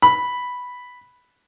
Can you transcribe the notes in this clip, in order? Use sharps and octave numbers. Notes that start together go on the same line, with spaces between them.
B5